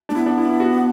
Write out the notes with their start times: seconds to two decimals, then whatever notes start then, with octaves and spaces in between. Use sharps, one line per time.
0.09 A3 D4
0.15 B3 E4
0.26 D4
0.38 E4
0.49 E4
0.60 F#4